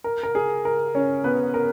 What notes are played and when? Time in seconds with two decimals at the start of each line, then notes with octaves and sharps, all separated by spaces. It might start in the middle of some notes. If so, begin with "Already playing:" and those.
0.04 A#4
0.23 A#4
0.35 G#4
0.65 A#4
0.95 C#4 C#5
1.24 B3 B4
1.54 A#4